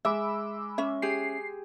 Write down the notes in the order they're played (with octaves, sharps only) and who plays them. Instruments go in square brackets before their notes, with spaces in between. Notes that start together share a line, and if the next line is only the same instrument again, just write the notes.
[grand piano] G#3 [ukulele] E5 [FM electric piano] B5 D6 E6
[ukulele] C#4 E5
[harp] G4 G#4 [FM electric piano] C7